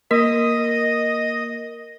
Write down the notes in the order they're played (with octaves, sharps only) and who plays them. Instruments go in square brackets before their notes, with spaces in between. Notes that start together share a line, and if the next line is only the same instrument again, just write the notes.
[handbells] A#3 A#4 [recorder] D#5